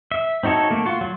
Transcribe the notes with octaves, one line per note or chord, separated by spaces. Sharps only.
E5
C4 D#4 F#4 A4 C#5
A3 A#3
F4 F#4
F#3 F4